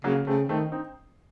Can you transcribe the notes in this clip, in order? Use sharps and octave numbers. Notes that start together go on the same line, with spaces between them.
C#3 F#3 A#3
C#3 A3 C4
D#3 A3 C4
C4 D#4